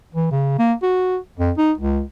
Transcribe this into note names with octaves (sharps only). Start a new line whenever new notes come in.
E3
C#3
A#3
F#4
F2
D#4
C#2